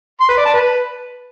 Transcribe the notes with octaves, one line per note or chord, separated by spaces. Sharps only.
C6
B4
D5
A5
B4